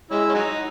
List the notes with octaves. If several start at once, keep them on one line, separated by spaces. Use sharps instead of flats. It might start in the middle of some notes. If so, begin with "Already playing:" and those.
G#3 C#4 E4
C#4
F#3 D#4